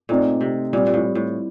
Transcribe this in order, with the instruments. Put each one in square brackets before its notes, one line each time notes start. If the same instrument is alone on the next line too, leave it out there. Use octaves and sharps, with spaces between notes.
[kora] A#2 [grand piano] A3 C4 D#4
[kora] C3
[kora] A#2 [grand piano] G3 C4 F4
[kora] G2
A2
A2